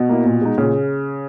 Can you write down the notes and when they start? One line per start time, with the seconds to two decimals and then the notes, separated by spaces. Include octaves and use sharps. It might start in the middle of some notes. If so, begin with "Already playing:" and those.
Already playing: B2
0.09 A#3 E4
0.26 A#2
0.42 G#3 D#4
0.57 A#2 C#3